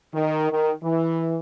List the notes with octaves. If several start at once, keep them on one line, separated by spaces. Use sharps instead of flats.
D#3
D#3
E3